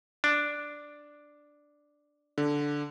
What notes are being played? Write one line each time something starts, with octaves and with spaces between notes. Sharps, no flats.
D4
D3